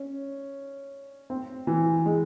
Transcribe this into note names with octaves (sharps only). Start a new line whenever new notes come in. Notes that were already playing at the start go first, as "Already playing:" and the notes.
Already playing: C#4
C4
E3
G#3